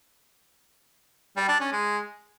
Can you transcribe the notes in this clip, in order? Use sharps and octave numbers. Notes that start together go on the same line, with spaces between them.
G3
D4
C#4
G#3